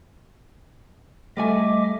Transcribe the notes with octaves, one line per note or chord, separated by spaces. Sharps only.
G3 A3 D#5 E5 G#5 D6